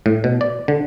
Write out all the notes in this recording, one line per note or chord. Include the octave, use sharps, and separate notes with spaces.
A2
B2
D5
D3